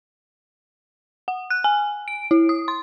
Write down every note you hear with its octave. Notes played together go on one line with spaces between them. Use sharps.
F#5
F#6
G#5
D7
E4
D#6
C6